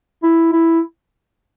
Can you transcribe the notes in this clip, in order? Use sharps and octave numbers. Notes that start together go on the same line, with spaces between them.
E4
E4